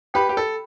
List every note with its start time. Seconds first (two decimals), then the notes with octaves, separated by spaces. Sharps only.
0.14 G4 B4 G5 B5
0.29 G4
0.37 A4